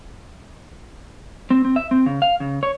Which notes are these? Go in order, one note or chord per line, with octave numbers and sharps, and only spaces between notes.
C4
C4
E5
C4
C#3
F5
C#3
C#5